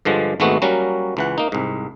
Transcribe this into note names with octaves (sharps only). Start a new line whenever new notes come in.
G2 D3 F3 G#3
G#1 G#2 G#3 A3 B3 F#4
F#3 G3 A#3 C#4 F#4
C#2 E3 F#5
A#3 D#4
C2 G#2